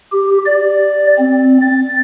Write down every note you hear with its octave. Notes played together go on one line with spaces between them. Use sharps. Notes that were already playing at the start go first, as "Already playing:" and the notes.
G4
D5
C4
A6